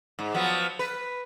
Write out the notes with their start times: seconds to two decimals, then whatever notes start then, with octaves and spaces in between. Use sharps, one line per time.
0.19 G#2
0.34 F3 F#3 B3
0.79 B4